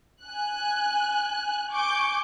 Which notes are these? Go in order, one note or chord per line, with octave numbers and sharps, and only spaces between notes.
G#5 F#6
G#5 C#6 D6 G6 D7